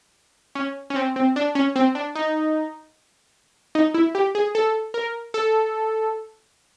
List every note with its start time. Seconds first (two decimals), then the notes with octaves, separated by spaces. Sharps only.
0.55 C#4
0.90 C#4
0.96 C4
1.16 C4
1.36 D4
1.55 C#4
1.76 C4
1.95 D4
2.15 D#4
3.75 D#4
3.94 E4
4.15 G4
4.35 G#4
4.55 A4
4.94 A#4
5.34 A4